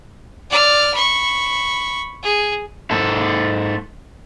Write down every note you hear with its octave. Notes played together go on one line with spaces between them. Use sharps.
D5 F6
B5 C#6
G#4
G#2 A4